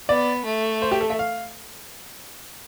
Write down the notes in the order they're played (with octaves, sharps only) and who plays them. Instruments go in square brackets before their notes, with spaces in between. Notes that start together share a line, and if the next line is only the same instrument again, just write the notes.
[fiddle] B3 [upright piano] D5
[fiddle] A3
[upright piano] C5
G4
A4
E5
F5